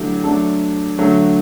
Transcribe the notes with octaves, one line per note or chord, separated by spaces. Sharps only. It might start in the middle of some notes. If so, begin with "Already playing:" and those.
Already playing: D3 F#3 A3 E4 G4
F#3 A3 D4 A4
D3 F#3 A3